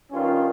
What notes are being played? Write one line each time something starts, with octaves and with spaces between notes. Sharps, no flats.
G2 D#3 C#4 F4